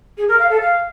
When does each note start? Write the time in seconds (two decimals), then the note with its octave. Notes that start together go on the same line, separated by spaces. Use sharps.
0.17 G#4
0.28 A#4
0.39 F5
0.49 A4
0.60 F5